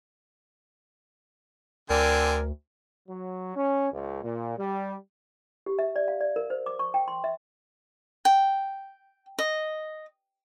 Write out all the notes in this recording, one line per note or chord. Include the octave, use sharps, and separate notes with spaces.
D2 D3 C4 A#4 D5 G#5
F#3
C#4
C#2
A#2
G3
G4
E5
D5
F5
D5
A#4
C5
D6
C#6
G5
C6
E5
G5
D#5